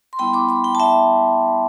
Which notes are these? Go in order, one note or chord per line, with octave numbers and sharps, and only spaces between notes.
C6
G3 B3 E4 G5 B5
B5 D6
B5 D6
G5 B5
A5
E5 G5